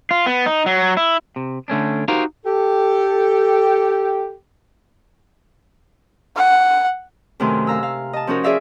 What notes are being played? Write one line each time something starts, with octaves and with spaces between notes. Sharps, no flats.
F4
B3
D#4
F#3
E4
C3
D3 A3 C#4 D4
D#4 F#4 G4 A#4 C5 F5
G4 A4
F#5
F#2 C3 D#3 A3 G#5 C6
F5 A#5 E6
F5
D#5 A5
F3 C#4 D#4 F#4 A#4
G#4 D5 E5 F5